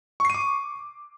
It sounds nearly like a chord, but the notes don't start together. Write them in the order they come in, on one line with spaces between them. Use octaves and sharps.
C#6 C7 D#7 D6